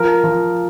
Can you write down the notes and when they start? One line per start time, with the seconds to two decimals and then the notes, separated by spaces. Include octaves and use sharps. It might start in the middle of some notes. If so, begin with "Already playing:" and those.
Already playing: F3 A#4
0.24 F3